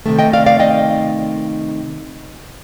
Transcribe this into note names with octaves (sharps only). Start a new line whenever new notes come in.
C3 D#3 A3
D#5 G5
D5 F5
D5 F5
D#5 G5